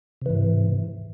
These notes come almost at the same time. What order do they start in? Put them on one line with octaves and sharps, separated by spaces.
C3 E3 G#2